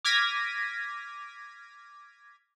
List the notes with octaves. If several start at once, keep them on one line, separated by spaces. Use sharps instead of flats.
D6 F6 G#6 A#6 B6 D#7